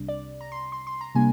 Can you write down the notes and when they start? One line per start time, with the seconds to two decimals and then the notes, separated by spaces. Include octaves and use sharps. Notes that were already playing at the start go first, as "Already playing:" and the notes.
Already playing: C2 C3 G3 D4
0.08 D5
0.41 A#5
0.52 C6
0.72 C6
0.87 C6
1.01 A#5
1.15 C3 G3 A#3 D4 G#5